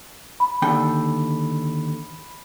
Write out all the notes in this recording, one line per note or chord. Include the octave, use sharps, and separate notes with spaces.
B5
D#2 D3 G5